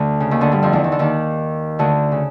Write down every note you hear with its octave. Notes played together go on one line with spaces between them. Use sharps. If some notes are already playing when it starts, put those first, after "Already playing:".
Already playing: D2 D3
C#3
D#2 D#3
D2 D3
G2 G3
F2 F3
E2 E3
D#3
D3
D#2 D#3
D2 D3
C#3